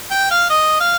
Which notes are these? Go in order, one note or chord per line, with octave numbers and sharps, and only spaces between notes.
G5
F5
D#5
F5